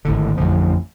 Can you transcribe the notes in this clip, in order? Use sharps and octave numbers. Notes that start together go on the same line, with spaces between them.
G#1 A2 D3
A1 F2 D3 F3